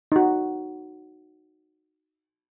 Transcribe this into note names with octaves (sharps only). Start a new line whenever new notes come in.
D#4 F#4